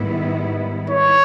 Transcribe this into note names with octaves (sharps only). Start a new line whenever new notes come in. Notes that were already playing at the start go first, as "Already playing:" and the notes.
Already playing: G#2 D#3 G3 B3 E4
C#5